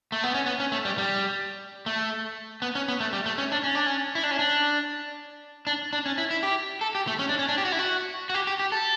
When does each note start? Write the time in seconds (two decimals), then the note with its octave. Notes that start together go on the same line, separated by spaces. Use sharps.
0.12 A3
0.24 B3
0.34 C#4
0.46 B3
0.60 C#4
0.72 A3
0.85 G3
0.98 G3
1.86 A3
2.62 B3
2.75 C#4
2.88 B3
3.00 A3
3.13 G3
3.26 A3
3.38 C#4
3.52 D4
3.63 C#4
3.75 D4
3.87 C#4
4.15 E4
4.24 D4
4.31 C#4
4.39 D4
5.67 D4
5.93 D4
6.06 C#4
6.18 E4
6.31 E4
6.43 G4
6.81 A4
6.95 G4
7.07 A3
7.19 C#4
7.29 D4
7.39 C#4
7.49 D4
7.58 G4
7.65 F#4
7.72 E4
7.79 F#4
8.30 F#4
8.34 G4
8.47 G4
8.60 G4
8.72 A4